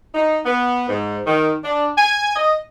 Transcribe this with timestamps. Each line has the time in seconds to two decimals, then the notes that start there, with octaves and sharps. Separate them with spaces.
0.15 D#4
0.45 B3
0.89 G#2
1.27 D#3
1.64 D4
1.97 G#5
2.36 D#5